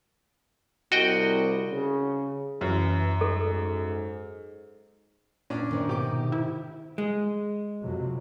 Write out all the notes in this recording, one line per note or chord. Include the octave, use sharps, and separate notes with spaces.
C2 F#4 D#5 G5
C#3
F#2 E3
G#2 A4
A#2 C#4 D4
G#2 C3 D#3
B2 G4 D6
E4
G#3
F2 C3 F#3